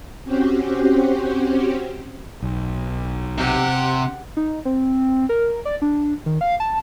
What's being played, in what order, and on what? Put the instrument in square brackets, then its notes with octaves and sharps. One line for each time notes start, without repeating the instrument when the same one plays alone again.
[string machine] C4 C#4 F#4 G4 C5
[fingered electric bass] B1
[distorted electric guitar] C3 [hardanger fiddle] G4 F#5
[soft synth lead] D#4
C4
A#4
D5
D4
D#3
F5
A5